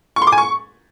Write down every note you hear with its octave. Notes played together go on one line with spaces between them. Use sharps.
C#6
C6
D6
G#5
C#6